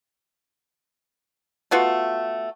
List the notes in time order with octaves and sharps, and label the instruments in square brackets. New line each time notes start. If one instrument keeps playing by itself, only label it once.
[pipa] A3 B3 F4 F#4